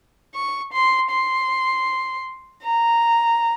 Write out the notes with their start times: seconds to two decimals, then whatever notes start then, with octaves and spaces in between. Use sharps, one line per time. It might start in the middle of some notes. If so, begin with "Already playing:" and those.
0.35 C#6
0.73 C6
1.10 C6
2.64 A#5